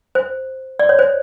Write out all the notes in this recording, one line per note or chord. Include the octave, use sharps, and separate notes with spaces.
C5
D5
C#5
C5